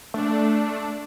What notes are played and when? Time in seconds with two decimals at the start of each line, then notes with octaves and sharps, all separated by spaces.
0.14 A3 D4